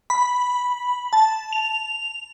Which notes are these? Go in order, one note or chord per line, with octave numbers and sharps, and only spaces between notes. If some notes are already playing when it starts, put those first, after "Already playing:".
B5
A5
F7